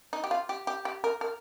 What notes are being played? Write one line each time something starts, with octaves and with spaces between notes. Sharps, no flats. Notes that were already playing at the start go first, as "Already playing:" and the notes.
D#4
G4
F4
G4
G4
G4
A#4
A#4